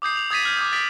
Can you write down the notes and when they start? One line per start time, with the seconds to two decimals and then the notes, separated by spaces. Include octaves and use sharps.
0.02 D6 D#6 G6 C7
0.16 F7
0.31 D#6 G#6 A6 B6 D#7
0.45 F6 G6 G#6
0.57 D6 D#6 G6
0.72 D#6 A6 B6 D7 F#7